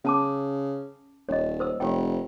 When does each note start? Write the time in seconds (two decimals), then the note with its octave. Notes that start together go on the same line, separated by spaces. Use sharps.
0.05 C#3 C#4 A5 D6
1.29 D#1 C#5 D#5
1.60 C5 E6
1.80 F1 G4 C#5 G5